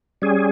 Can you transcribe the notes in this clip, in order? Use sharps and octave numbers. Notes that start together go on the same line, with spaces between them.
G3 C#4 G#4